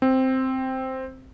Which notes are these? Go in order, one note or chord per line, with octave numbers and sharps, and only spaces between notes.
C4